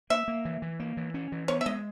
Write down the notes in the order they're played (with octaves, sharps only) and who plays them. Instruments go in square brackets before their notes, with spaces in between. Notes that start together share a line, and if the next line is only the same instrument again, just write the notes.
[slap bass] A#3 [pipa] E5
[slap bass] A#3
E3
E3
A#3
E3
C#4
E3
[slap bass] B3 [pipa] C#5
[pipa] E5
[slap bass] G#3 [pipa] D#5